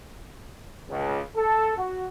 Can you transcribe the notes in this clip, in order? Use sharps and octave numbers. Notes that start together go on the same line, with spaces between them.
C#2
A4
F#4